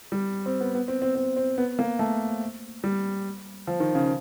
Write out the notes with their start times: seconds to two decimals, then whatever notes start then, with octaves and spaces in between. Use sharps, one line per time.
0.12 G3
0.46 C4
0.61 B3
0.75 B3
0.88 C4
1.02 C4
1.15 C4
1.36 C4
1.58 B3
1.79 A#3
1.99 A3
2.84 G3
3.67 F3
3.80 D#3
3.95 C#3